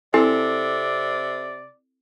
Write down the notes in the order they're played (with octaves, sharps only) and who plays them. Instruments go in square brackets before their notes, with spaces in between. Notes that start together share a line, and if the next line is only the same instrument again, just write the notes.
[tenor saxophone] C3 [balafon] C4 E4 [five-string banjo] A4 [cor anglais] D5